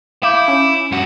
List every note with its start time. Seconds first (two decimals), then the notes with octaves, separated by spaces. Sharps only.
0.23 E4 F5 D6 G6
0.48 C#4
0.92 G2 F#4